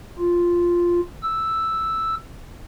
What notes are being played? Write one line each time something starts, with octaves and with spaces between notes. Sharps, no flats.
F4
E6